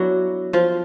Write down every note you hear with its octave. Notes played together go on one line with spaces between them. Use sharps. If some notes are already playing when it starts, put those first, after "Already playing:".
Already playing: F#3 B3 D4 E4 F#4
F3 F4